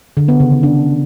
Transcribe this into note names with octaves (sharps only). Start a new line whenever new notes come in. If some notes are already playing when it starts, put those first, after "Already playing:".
D3
B3
C#3
D#3
D4